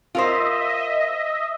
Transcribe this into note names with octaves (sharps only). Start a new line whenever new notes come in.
F4 A#4 C5 D#5 E5